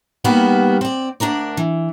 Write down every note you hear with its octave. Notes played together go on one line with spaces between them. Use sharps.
D#3 G3 A#3 B3 F#4
C4 D5
D2 D4 A#4 D5
E3